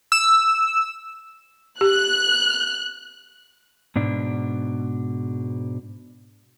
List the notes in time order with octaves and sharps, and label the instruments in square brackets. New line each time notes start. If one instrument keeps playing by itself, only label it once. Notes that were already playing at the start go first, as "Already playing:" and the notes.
[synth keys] E6
[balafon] G4 [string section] F#6
[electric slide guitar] G#2 B2 D4